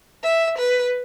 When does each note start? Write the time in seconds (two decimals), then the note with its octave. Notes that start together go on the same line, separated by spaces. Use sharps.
0.24 E5
0.58 B4